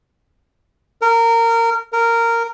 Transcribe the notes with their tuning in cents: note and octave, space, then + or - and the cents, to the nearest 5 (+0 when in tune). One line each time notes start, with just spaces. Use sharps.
A#4 -20
A#4 -10